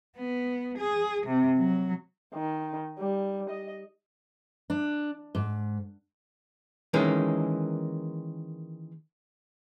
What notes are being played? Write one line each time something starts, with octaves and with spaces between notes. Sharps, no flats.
B3
G#4
C3
F#3
D#3
G3
D#5
D4
G#2
D#3 E3 G#3 A#3 C#4